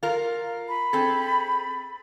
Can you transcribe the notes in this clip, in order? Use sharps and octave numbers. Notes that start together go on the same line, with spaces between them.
F4 A#4
B5
C4 G#4 A4